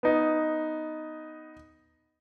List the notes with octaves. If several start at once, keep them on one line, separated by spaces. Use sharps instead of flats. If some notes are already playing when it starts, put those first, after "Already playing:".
B3 D#4